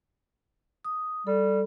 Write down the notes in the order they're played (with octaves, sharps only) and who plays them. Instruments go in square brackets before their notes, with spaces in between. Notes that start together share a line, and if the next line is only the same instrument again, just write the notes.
[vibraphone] D#6
[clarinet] G3 [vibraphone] A4